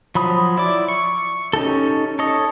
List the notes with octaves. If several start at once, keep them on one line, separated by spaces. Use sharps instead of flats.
F3 F#3 B5 D#6
E4 D5 D6
C#6
C#4 D#4 G4 A4
A4 C#5 D#5